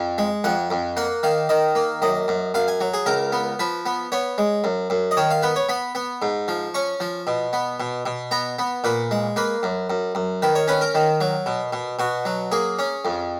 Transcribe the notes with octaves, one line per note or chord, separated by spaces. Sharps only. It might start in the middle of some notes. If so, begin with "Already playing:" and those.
Already playing: F2
G#3
F2 F#5
F2
A#3 F#5
D#3 F5
D#3 D#5
A#3
F#2 D#5
F#2
F#2 F5
G#5
F#3
G#4
C#2 A#4
B3
F3 B4
B3
B3 C#5
G#3
F#2
F#2
D#5
D#3 C#5
F5
B3 B4
C#5
B3 B5
B3
G#2
F3
C#4 C#6
F3
B2
B3
B2
B2
B3 A#5
B3
A#2 B4
G#3
A#3 B4
F#2
F#2
F#2
D#3 B4
C#5
C#4 B4
A#4
D#3
F#3
B2
B2
B2 F#4
F#3
A#3 G#4
C#4
F2